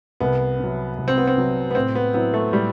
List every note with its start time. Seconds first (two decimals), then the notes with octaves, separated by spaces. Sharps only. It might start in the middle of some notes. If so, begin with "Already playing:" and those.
0.20 C2 B3
0.59 C3 F#3
0.98 C2
1.08 C4
1.18 B3
1.28 C4
1.37 C3 F#3
1.71 B3
1.75 A2 C4
1.95 B3
2.14 F#3 B3 C4 E4
2.34 A3
2.53 A2 G3